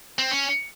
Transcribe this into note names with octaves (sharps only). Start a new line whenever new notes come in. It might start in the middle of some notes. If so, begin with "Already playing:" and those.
C4
C#4